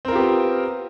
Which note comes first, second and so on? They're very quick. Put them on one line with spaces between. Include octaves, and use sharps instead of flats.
C4 A#4 F4 G4 B3